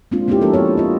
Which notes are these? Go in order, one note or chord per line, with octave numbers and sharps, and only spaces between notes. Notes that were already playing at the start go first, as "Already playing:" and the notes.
G#3 A#3 C4 D4 F4
A#3 B3 C#4 D#4 E4 G4
F3 A#3 D4 A4 A#4
F#4 G4 C#5
F4 D#5